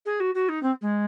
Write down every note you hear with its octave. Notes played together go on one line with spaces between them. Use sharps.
G#4
F#4
F#4
D#4
C4
G#3